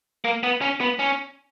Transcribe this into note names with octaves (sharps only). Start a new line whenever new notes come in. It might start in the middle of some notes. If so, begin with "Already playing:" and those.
A#3
B3
C#4
B3
C#4